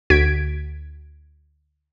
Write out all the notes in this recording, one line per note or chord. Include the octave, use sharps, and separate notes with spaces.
D2 F#4 G#6 B6 D7